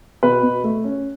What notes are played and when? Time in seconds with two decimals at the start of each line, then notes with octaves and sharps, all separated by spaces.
0.23 B2 B4
0.43 B2
0.64 A3
0.84 C#4